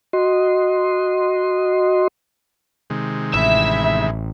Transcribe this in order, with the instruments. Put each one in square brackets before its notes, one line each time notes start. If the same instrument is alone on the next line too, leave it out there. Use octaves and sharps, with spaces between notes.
[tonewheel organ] F#4 D#5 C6
[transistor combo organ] C3 D#3 G#3
[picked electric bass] A1 [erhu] E4 [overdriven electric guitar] E5